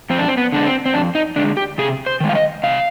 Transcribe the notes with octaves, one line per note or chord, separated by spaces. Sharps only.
F2 C4
D4
C4
B3
D3 G#3 D4
C4
C4
F2 D4
D#4
D3 G#3 D4
G4
C3 G#4
C5
D#3 G#3
F5
D#5
C3 F5